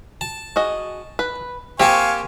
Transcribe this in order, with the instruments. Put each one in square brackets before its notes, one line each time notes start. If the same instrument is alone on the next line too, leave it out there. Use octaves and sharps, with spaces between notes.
[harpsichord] A5
[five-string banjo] F#4 G#4 D#5
B4
[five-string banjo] A#3 C4 C5 [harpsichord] G4 A5 [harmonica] F5 G#5 C#6